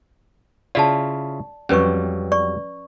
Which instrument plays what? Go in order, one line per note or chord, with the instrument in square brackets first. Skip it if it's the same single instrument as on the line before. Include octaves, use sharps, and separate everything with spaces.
[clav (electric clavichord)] C#3 E4 F4 [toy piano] D5 A5
[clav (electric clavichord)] F2 F#3 G3 [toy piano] C#4 B4 C#6
[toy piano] D5 C#6